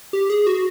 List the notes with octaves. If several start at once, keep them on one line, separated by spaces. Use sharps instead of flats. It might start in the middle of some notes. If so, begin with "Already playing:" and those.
G4
G#4
F#4